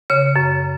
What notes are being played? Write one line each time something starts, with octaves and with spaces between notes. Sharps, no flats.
C#3 C#5
F#2